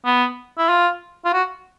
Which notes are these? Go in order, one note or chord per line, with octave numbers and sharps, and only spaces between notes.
B3
E4
F4
F4
F#4